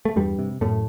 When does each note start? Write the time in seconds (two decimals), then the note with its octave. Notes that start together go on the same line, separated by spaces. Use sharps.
0.05 A3
0.16 E2 G2 G3
0.39 C3
0.61 F#2 A2 A3